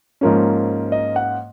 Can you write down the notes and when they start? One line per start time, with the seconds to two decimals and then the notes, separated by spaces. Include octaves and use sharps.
0.21 G#2 F3 A#3 C#4
0.92 D#5
1.16 F#5